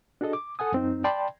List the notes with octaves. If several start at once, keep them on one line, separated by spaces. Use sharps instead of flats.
D4 F#4 G#4 A4 D#5
D6
A4 F#5 G#5 D#6
F#2 C4 D#4
D5 G5 A5 B5 C6